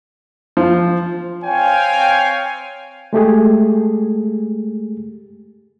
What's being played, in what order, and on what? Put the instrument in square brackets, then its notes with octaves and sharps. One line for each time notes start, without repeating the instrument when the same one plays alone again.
[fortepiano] F3
[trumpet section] C4 C#5 F5 G5 G#5
[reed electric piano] G#3 A3 G4 G#4